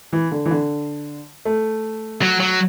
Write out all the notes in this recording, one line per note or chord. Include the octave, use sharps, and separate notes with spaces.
E3
D3
E3
D3
A3
F#3
F#3